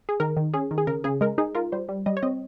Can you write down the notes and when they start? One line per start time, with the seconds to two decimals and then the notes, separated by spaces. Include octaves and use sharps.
0.09 G#4
0.20 D#3 A#4
0.37 D#3
0.54 C#4 G#4
0.71 D#3
0.78 G#4
0.87 C#3 A#4
1.04 C#3 G#4
1.21 G#3 A#4
1.38 D#4 G#4
1.55 F4 A#4
1.72 G3 C5
1.89 G3
2.06 G3 D#5
2.17 C#5
2.23 C4 D#5